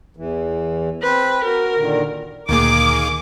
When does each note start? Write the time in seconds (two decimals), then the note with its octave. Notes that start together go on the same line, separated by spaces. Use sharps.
0.17 E2 E3
1.03 C4 B4 C5
1.44 F#4 A#4
1.77 A#2 D3 D#3
2.49 D2 A#2 D#3 A#3 G#4 D6